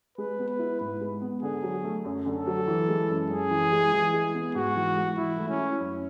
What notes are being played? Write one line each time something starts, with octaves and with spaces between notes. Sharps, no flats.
G#3 B4
B3
B4
E4
G#2 B4
G#3
B3
D3 G#4
F#3
A3
F#2
D3
A4
F#3
E3
G#3
F#2
F#2 G#4
E3
G#3
E3
G#3
B3
G#2 F#4
E3
G#3
E3 E4
A3
C#4
E4
F#2